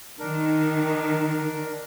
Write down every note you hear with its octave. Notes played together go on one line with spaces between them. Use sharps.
D#3 D4 A#4